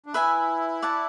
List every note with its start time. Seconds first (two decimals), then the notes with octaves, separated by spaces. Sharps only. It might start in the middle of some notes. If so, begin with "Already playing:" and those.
0.06 D4
0.14 E4 B4 E5 G#5
0.82 D5 F#5 A5